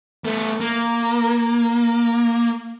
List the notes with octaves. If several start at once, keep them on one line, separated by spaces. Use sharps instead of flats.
A3 B3
A#3